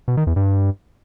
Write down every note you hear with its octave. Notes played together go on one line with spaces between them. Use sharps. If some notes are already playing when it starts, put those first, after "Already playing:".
B2
D#3
E2
G2